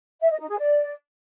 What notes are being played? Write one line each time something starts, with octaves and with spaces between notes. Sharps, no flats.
E5
D#5
D#4
G#4
D5